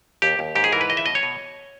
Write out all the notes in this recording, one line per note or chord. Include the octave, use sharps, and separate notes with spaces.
D#2 G4
D#2
G#2 G4
G#4
E3 A#4
B4
C#2 D#5
E5
B2 D#5
C#5
B2